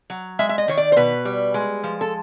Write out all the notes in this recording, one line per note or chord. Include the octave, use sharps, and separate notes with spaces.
F#3
G#3 E5
E5
D#5
D#3 C#5
D5
C5
B2 B4
G3
G#3
F3
A4